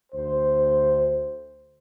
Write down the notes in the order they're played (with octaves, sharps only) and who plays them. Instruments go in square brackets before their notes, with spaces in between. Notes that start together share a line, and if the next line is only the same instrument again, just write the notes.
[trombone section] D2 C5